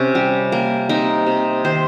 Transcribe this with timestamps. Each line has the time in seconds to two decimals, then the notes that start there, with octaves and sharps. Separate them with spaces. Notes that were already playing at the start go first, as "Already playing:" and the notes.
Already playing: C3 C#4
0.15 G3
0.52 A#3
0.89 C3 D#4
1.26 C3
1.65 D#3 C5